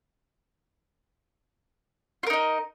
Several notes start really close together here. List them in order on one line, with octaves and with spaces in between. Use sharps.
F4 A#4 D#4 D#5